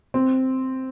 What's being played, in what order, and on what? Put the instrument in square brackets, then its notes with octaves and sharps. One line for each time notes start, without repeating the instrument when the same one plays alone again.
[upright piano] C4